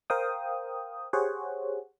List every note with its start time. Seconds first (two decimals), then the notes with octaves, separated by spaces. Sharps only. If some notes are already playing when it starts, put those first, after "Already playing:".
0.10 A#4 C5 F5 G5 D#6
1.13 G4 G#4 C5 C#5 F#5